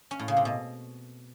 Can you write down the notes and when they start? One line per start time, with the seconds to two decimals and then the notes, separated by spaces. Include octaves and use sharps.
0.11 C#4
0.19 A2
0.28 C#3
0.37 C3
0.45 B2